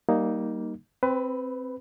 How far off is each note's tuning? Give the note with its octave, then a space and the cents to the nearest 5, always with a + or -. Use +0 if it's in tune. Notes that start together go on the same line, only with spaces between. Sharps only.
G3 -20 A#3 +0 D#4 +0
C4 +0 B4 +25 B5 +0